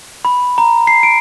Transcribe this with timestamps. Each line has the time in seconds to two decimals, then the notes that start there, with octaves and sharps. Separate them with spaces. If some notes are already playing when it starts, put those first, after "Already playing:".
0.25 B5
0.58 A#5
0.87 C7
1.03 D7